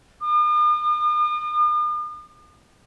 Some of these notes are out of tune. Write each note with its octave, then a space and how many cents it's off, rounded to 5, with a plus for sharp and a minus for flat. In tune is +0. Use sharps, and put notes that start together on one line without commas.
D#6 -45